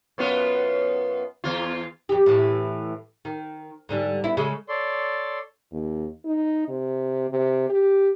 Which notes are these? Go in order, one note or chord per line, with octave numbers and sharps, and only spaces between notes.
F#2 B3 F4
E2 F4
F2 G4
A2 E3
D#3
G#2 D3 G3
B3 E4
C#3 G#3 A4
A4 C#5 D5 C6
D#2
D#4
C3
C3
G4